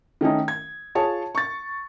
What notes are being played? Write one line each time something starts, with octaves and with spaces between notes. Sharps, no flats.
D#3 A3 C#4 D#4
G#6
F4 G#4 C#5 A5
C#6 A6